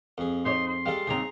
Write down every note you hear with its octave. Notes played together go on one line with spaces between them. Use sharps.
F2 G#4
D#4 C5 C#5 C6
C6
G3 G#3 A4 F5
D#2 C#3 C4 G#4 A#5